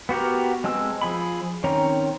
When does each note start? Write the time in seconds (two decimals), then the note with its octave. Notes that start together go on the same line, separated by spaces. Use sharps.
0.09 B3 F#4 G4 A#4
0.64 G#3 C4 A5 E6
1.01 F3 G#4 B5
1.64 D#3 C4 C#4 C#5 A#5